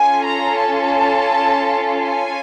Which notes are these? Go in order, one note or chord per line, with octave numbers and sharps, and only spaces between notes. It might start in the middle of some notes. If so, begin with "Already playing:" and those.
Already playing: C#4 F4 A4 G#5
A#5
A5
G#5